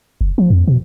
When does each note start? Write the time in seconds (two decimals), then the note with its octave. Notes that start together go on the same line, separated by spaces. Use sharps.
0.21 F#1
0.38 F3
0.50 F2
0.68 B2